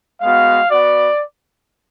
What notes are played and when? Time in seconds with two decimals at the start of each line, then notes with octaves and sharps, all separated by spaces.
0.21 G#3 B3 F#4 F5
0.70 B3 F#4 D5